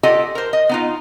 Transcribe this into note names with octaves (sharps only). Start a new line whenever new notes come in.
F4 G4 A4 D5 D#5 F#5
A#4 C5
D#5
B3 D#4 F4